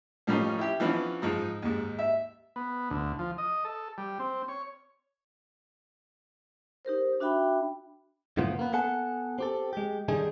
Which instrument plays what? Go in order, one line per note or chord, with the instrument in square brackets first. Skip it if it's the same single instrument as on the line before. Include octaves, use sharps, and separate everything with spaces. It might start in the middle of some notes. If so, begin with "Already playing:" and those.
[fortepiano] A2 F3 G3 A#3 C#4 D#4
E4 G4
E3 F3 B3 C#4 D4
G#2 F3 D#4
D#2 G#2
E5
[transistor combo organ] B3
D2
F3
D#5
A4
G3
C4
C#5
[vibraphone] D#4 G4 A#4 C5
D4 F#4 E5 G5 B5
[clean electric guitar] F#2 A2 C#3 F3 B3 F4
A#3 B3
B3 A4 F#5 G#5 A5
C4 G4 A4
G#3 G4
D3 D#3 G3 D4 D#4 G#4